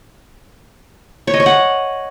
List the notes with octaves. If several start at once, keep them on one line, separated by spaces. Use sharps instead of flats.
C#5
D#5
C#5
F#5